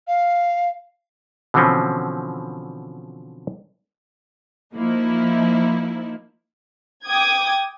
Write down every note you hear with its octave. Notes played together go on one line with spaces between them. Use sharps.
F5
B2 D3 E3 F3 C4 C#4
F3 A#3 D#4 E4
G5 D6 D#6 G#6